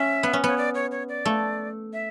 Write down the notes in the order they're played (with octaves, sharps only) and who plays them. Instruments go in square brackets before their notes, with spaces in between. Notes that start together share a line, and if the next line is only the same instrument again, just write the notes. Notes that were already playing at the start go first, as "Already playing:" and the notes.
Already playing: [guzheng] C#4 [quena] E5
[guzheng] B3
C#4
[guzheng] B3 [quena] C#5
[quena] D5
C#5
C#5
D5
[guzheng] A3
[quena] E5